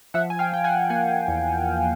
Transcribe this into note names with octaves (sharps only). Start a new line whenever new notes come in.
F3 E5 F#5
G#5
F5 G5
F3 G5
F#5 G#5
A#3 F#5 G#5
E2